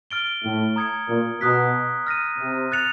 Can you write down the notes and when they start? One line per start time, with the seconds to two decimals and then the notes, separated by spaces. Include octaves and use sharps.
0.11 F6 A6 D7 G7
0.44 A2
0.76 A#5 D#6 G#6 C#7
1.09 A#2
1.41 B2 A#5 D#6 F#6 B6
2.07 F6 A#6 D#7
2.39 C3
2.72 F#6 A6 C#7 F7